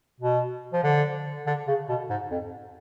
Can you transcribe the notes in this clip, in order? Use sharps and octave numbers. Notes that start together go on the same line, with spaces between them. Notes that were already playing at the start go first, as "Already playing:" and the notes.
B2
F3
D3
D3
C#3
B2
G#2
F2